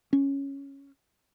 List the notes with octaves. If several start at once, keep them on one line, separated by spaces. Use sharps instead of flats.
C#4